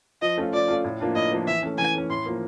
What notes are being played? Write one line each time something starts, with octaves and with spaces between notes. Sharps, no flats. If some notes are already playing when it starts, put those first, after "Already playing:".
F3 D#5
A3 C#4 F4
F3 D5
A3 C#4 F4
A2
F3 A#3 D4 F4
A2 D#5
F3 A#3 D4 F4
E3 E5
A3 C#4
E3 G#5
A3 C#4
A2 C6
F3 A#3